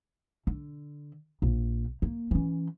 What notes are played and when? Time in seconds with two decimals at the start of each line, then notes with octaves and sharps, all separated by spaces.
0.47 D3
1.42 A#1
2.02 A#3
2.31 E3 C#4